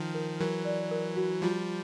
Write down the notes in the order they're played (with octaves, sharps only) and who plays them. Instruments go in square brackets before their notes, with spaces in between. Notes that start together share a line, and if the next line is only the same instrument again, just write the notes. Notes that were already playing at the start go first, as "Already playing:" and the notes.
Already playing: [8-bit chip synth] D#3 F3
[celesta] A#4
[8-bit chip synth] E3 F#3 [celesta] A#4
[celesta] D5
A#4
F#4
[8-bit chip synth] F3 G3 [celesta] F4